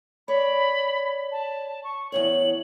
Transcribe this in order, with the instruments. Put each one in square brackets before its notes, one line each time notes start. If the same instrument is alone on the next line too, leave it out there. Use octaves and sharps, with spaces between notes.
[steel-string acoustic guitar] C#5 D5 [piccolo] B5
[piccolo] A5
C#6
[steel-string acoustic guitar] E2 C#3 C#5 [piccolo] F#7